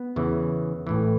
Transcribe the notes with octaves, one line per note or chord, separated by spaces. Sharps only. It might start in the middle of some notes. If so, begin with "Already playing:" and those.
Already playing: B3
E2 C#3 E3
A1 A2 E3